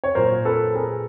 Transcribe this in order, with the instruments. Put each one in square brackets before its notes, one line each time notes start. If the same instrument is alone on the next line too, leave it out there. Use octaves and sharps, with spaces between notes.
[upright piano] C#5
A#2 F#3 A#4 C5
A4 B4
G#4 A#4